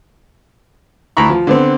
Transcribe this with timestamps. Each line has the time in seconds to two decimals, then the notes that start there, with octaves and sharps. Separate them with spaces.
1.17 D2 E4 A#5 B5 C#6
1.30 F3
1.47 D3 B3 C4